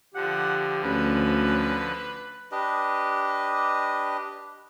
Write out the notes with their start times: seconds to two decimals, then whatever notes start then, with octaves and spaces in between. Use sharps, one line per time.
0.15 D3 F3 G4 F#5
0.84 D2 C#4 B4
2.52 D4 G4 B4 D#5